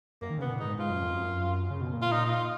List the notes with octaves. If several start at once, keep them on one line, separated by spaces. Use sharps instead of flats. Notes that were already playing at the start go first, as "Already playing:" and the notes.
F#2 A#3
D#3
C#3
B2 B3
A#2
G#2 D#4
G#2 F4
F#2
F2
F#2
C#3
B2
A#2
F4
D#4
D#4
F4